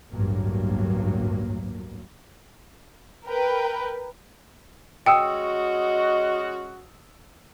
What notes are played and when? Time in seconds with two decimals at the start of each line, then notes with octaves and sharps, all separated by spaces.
0.12 A1 D2 G2 F#3 A#3
3.26 A#4 B4 G5
5.06 G#3 C#4 F#4 D#5 G5 D#6 E6 C#7